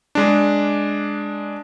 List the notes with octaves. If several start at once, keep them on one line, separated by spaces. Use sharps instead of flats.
G#3 D4